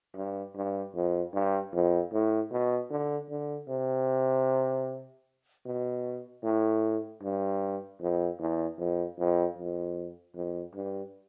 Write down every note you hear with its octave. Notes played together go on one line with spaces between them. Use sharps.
G2
G2
F2
G2
F2
A2
B2
D3
D3
C3
B2
A2
G2
F2
E2
F2
F2
F2
F2
G2